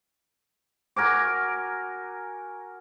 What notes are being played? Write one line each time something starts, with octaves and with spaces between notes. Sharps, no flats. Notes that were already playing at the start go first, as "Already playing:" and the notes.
F#4 A#4 G#5 D6